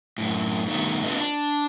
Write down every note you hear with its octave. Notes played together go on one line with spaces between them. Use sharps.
F#2 A2
G2 B2 D#3 A3
A#3 C4 D4 F4 B4 D#5
D4